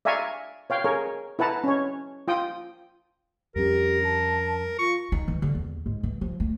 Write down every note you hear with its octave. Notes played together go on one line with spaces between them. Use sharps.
D5 E5 F5 G#5 A#5 C#6
C#5 F5 G5
G#4 A#4 C#5
E4 B4 F#5 A5 A#5
C#4 C#5
F4 G5 D#6
F2 G3 C#4 G4 A#4
A5
F4 C#6
D#4
E3
D3
E2
G#2
E3
F3
A3